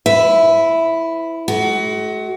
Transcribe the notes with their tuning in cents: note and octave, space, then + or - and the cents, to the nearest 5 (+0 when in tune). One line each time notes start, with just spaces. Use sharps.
E4 +0 B4 +45 E5 +0
A3 -40 F#4 +25